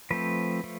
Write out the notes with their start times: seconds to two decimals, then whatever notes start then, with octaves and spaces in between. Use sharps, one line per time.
0.11 F3 A3 C4 B4
0.64 F3 A3